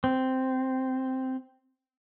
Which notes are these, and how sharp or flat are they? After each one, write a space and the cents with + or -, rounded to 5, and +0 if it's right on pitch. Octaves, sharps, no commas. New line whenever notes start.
C4 -5